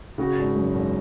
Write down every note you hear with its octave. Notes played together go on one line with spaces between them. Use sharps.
C#3 F#4
G#1
F#2
G#1